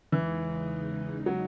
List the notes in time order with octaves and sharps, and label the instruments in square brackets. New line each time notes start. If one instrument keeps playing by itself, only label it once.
[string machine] E2 C#3 G#3 D#4 [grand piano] E3
[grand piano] F#3